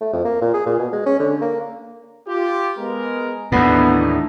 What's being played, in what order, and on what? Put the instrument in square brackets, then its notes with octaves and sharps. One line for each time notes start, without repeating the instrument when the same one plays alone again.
[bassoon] A3
F2
A#3
A#2
G#4
A#2
B2
G#3
C#4
D3
A#3
[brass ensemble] F4 G4
G#3 B3 A#4
[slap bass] D#2 A2 [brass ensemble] E3 D4 D#4 [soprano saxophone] B3